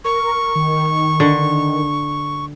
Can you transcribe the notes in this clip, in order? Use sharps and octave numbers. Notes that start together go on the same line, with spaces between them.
A#4 C#6
D#3
D3